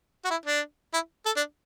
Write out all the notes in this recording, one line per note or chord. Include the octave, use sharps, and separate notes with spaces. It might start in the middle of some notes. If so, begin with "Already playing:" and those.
F#4
E4
D4
E4
A4
D4